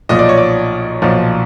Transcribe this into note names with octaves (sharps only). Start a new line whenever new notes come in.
B1 A#2 F3 D#5
D5
C#5
D5
B1 A#2 F3